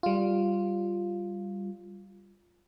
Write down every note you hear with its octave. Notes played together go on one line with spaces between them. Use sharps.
G3 F4